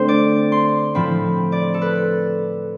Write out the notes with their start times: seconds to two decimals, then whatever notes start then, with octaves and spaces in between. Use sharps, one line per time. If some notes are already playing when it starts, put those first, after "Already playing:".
Already playing: D3 A3 C4 C5
0.08 D5
0.52 C6
0.95 A2 F3 C4 B5
1.52 D5
1.74 A4
1.81 B4